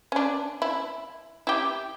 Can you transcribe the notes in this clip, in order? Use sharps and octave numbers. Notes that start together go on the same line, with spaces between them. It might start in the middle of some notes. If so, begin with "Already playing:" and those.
C#4 D4
E4
E4 G4